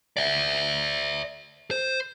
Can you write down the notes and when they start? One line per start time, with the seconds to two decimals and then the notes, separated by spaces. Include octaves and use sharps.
0.17 D5 E5
1.71 C5